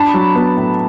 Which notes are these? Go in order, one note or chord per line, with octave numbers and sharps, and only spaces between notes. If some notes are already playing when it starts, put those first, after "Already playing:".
Already playing: D4 A5 B5
F#3
B3
A2